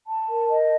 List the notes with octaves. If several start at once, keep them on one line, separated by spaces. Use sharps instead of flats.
A5
A#4
D#5